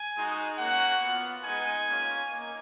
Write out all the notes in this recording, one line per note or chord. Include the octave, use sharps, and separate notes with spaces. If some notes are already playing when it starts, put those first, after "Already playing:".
Already playing: G#5
G#3 D#4 F#4
A#3 C#4 F#4 F#5
B3 F4
G#3 B3 D#4 G#5
A#3 C#4 F4
A#3 D#4